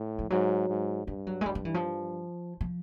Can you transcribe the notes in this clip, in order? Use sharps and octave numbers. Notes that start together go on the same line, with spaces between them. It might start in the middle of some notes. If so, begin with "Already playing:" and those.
Already playing: A2
F3
G#2 F#3
G#2
G2 G3
F#3
G#3
G2 G3
F3
E3
F3
F3